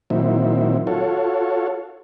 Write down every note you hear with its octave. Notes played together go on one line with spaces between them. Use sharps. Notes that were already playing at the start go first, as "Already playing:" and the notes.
A#2 D#3 F#3 C4 E4
F4 F#4 A4 C#5